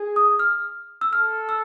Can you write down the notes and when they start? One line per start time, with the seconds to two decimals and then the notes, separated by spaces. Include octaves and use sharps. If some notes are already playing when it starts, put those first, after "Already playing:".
Already playing: G#4
0.16 D#6
0.39 F6
1.01 E6
1.13 A4 F6
1.49 E6